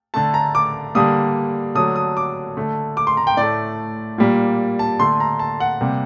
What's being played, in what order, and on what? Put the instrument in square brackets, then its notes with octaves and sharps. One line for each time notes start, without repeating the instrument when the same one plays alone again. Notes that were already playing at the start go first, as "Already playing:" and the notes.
[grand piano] D3 A3 A5
A#5
D6
D3 G3 A#3 D#6
D3 F#3 A3 D#6
D#6
D6
D3 A3
D6
C6
A#5
G5
A2 A3 D5
A#2 G3 A#3
A5
D3 A3 C6
A#5
A5
F#5
C3 G3 A#3